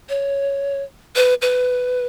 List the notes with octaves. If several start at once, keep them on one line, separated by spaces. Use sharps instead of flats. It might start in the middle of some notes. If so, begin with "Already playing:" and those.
C#5
B4
B4